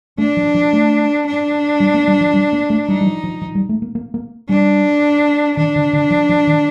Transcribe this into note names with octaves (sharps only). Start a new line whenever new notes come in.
A3 D4
F3
F3
A3
D4
G3
A#3
G3
F3
G3
A#3
A3
G3 D#4
G3
F3
F3
F3
G3
A3
A#3
A#3
A#3
G3 D4
D#3 D4
D3
D3
F3
F3
D#3